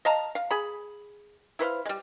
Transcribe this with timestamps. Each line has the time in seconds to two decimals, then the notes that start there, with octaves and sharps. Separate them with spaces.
0.05 D#5 F5 A5 A#5
0.35 F5
0.51 G#4 B5
1.59 E4 B4 C5 F5
1.85 G3 G#3